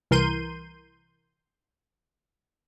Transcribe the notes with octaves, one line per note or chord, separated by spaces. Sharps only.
C2 E3 A#4 C6 G6 D#7